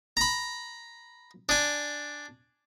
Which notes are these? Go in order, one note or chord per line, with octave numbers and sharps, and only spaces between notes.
A#5 B5
D4 G#5